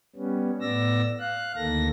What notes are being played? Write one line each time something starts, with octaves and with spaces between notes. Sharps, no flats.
G3 B3 C#4
A2 B3 D5 E6 A#6
F5 F#6
D2 D#3 A#3 A4 A#6